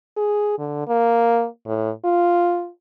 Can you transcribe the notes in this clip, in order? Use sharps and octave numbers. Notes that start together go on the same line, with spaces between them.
G#4
D3
A#3
A2
F4